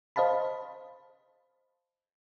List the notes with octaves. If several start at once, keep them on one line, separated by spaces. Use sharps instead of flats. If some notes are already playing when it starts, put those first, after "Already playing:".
C5 D#5 F5 A5 B5